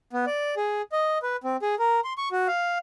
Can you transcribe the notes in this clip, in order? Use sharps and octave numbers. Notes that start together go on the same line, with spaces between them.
B3
D5
G#4
D#5
B4
C4
G#4
A#4
C6
C#6
F#4
F5